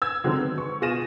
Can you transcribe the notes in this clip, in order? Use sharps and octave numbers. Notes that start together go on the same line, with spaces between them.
E6 G#6
D3 D#3 F#3 G#3 C4
B3
C#6
B2 F4 G#4 A#6 D#7 E7